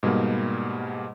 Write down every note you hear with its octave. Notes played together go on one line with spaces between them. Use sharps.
G#2 B2 G3 A#3